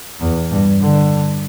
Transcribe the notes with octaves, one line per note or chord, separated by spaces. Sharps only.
E2
G2
D3